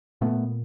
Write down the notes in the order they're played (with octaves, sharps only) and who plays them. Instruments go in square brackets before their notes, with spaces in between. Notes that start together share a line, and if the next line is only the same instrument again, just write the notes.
[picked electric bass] A#2 A3 B3